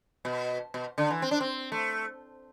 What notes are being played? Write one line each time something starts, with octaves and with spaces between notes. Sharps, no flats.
B2
B2
D3
E3
C4
D4
C4
A3